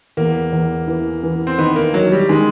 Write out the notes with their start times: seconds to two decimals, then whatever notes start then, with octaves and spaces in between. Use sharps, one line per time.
0.17 E2 A#3
0.53 E2
0.88 E3
1.23 E3
1.47 C4
1.59 D#3 B3
1.76 A#3
1.94 D#3 F#3
2.12 G3
2.29 D#3 G#3